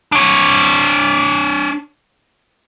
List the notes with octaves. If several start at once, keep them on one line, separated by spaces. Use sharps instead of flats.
D4 C#5